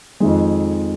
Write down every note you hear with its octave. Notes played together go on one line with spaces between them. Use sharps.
F2 D#3 G#3